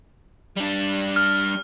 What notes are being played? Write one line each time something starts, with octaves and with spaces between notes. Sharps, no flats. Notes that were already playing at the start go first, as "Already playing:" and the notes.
G3 D4
F6